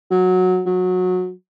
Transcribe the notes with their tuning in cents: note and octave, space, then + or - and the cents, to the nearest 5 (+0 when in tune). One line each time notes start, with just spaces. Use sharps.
F#3 -10
F#3 -20